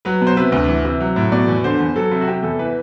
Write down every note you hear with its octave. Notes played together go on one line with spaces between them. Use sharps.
F#3 B4
B2
C5
C3 B4
D2
E3
C3
F#3
A2
B2 D5
E2
D3 C5
E2
F#3 A4
C3
F#4
C3 G4
E2 A4
E3 B4